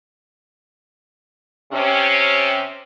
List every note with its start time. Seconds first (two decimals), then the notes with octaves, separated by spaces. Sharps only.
1.73 C3 C#4